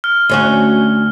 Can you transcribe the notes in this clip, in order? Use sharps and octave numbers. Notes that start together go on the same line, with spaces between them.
F6
D2 C#4 F#4